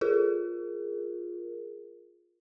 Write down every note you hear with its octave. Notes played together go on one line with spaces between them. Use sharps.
F4 G#4 A#4